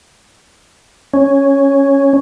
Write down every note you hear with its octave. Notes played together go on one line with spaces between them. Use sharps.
C#4